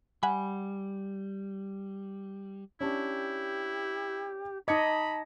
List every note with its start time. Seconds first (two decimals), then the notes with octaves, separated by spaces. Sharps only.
0.23 G3 F#5 G#5 B5
2.81 C#4 D4 E4 G4
4.68 D#4 D#5 A5 B5 D6 G#6 C#7